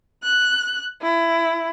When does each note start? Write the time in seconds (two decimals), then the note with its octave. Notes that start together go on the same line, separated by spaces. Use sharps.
0.24 F#6
1.02 E4